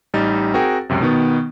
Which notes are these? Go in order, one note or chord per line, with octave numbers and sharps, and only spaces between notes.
A1 G3 D#4 A6
C4 F#4 G#4 A#4 G5
C#2 F#2 C3
B2 D#3 B3